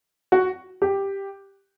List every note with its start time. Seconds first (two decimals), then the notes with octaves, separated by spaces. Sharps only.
0.32 F#4
0.82 G4